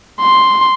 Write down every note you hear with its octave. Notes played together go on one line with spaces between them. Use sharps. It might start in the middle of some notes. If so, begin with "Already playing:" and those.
C6